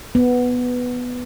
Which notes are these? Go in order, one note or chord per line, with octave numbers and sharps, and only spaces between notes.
B3